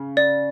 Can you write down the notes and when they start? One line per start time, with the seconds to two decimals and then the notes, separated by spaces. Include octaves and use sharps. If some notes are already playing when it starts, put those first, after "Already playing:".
Already playing: C#3
0.17 D5